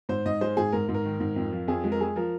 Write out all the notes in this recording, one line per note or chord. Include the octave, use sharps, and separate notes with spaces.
G#2 C5
G#2 D#5
G#3 C5
G#2 G#4
G#2 A#4
G#2
A#4
D#3
G#2
F2
F3
F2 G#4
G#3
A#4
G#3 G#4
F3 A#4